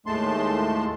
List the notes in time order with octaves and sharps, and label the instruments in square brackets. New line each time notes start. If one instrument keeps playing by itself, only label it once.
[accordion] D#2 A2 G#3 A3 A5 C6